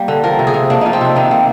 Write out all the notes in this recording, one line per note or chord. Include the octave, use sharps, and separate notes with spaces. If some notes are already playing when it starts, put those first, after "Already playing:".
Already playing: G3 A#3
D3
F3 A#4
C3
G#4
C3
A#3 D4
F3 D#4
C4
C3 D4
D#3 D#4
A#3